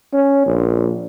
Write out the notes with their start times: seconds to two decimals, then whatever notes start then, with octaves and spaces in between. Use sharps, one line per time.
0.13 C#4
0.45 A#1